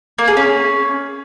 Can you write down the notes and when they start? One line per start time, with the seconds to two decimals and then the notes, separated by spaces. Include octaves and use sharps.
0.18 A#3
0.28 G#4
0.37 C#4